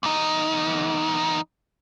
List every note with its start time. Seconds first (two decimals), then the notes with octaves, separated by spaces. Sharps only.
0.03 E2 D#4